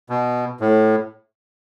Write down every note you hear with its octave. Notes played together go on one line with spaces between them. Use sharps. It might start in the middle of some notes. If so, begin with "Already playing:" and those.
B2
A2